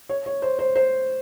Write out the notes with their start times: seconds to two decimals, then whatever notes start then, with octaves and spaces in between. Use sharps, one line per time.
0.09 C#5
0.26 C#5
0.42 C5
0.59 C5
0.76 C5